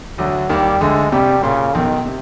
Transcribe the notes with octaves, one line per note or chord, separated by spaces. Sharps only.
D2 D3 F#3
D#2 D#3 G3
D2 D3 G#3
C2 C3 G3
A#2 C#3
B1 B2 D#3
C3